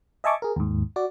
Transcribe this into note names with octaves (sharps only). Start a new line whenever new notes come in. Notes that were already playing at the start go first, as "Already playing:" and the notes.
D#5 E5 G#5 A5 C#6 D6
G#4 A#4
D#2 G#2
F#4 D5